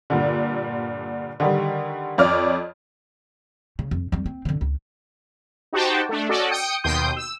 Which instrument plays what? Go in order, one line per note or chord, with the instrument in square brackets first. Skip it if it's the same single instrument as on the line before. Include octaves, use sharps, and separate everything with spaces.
[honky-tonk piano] G2 A#2 D3
D3 D#3 G3
F2 C#5 D5 F6
[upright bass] C#3
F2
F2 G3
C4
F2 D3
C#2
[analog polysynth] D#4 F#4 G4 C5 G5 A5
A3 D4
C#4 F#4 A4 D5 D#5
G5 D#6 C#7
D#2 B2 G5 C6 D#6 G6
E6